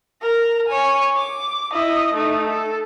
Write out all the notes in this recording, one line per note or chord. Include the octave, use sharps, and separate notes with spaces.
A#4 A#5
C#5 G#5
D6
E4 D#5
A3 D#4
A4